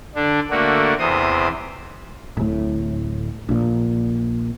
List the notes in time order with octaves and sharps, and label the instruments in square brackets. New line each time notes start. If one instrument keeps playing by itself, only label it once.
[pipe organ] D3 D4
D3 A3 A#3 F#4
E2 C3 C5 D#6
[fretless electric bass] D1 A2
A#1 A#2